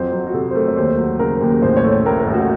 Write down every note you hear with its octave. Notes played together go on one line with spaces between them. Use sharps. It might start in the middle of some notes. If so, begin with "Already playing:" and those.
Already playing: F2 F#3 C5
F#3
F#4
C3 A4
C5
A3 A#4
C#5
D#2 C5
F#3
C#3 A#4
D#2
A1 C5
C#5
A3
C#5
A2 A#4
A#4
A1
F#4